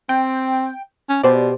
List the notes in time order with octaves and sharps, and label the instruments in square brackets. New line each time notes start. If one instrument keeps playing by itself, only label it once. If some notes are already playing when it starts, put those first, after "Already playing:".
[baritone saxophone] C4 [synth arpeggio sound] G5
[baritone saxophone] C#4
[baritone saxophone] B2 [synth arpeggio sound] G4 C5 D5